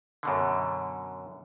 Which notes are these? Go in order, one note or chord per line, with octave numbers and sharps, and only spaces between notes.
F#2 B2 D3